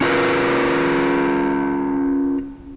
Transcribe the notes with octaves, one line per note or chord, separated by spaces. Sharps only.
C#4 F4 A#4 B4